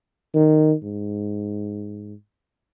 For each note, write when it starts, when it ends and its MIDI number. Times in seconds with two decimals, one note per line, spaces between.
0.34 0.73 51
0.83 2.14 44